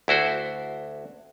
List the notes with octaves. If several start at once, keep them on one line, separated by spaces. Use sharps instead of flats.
D2 E4 F#4 C5